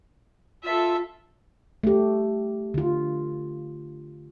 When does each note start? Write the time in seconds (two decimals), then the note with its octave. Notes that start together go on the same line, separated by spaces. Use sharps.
0.64 F4 A4 E5
1.83 A3 G4
2.74 D3 F4